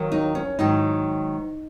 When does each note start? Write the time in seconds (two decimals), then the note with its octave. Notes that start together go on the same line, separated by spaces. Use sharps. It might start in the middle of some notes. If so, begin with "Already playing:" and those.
Already playing: D#2 D#3 F#3
0.12 D#4
0.35 C#4
0.59 G#2 D#3 F#3 D#4